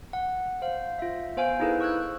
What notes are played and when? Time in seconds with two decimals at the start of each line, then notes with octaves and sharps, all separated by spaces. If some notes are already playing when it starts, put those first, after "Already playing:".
0.13 F#5
0.62 C5 F5
0.99 F4 E5
1.37 B3 C5 F5 G#5 D7
1.60 D#4 E4 G#4 A4 B4 C5
1.80 C#6 E6 F#6 G#6